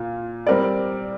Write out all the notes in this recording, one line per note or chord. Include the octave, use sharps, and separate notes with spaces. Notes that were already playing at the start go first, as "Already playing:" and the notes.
Already playing: A#2 F4
G3 C4 A#4 D5